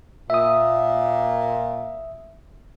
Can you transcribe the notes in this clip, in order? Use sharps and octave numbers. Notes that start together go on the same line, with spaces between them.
A#2 E5 D#6